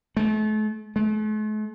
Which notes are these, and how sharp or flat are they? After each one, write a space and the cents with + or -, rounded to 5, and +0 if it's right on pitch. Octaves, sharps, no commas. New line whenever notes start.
A3 -40
A3 -45